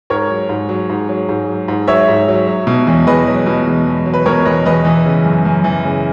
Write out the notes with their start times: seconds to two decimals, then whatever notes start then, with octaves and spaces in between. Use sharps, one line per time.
0.10 G#2 A#4 C#5
0.30 F#3
0.49 G#2
0.69 F#3
0.90 G#2
1.09 F#3
1.29 G#2
1.48 F#3
1.68 G#2
1.88 F#3 C#5 E5
2.08 G#2
2.28 F#3
2.47 F#3
2.67 B2
2.87 E2
3.07 E2 B4 D#5
3.28 F#3
3.46 B2
3.67 E2
3.87 E2
4.06 F#3
4.14 B4
4.26 B2 A#4 C#5
4.46 E2 B4 D#5
4.65 E2 B4 D#5
4.85 E3
5.06 C#3
5.25 F#2
5.45 F#2
5.64 E3
5.85 C#3